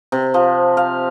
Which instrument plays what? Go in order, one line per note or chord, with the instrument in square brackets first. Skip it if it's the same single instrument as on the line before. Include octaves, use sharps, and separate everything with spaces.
[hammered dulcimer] C3
F3
F5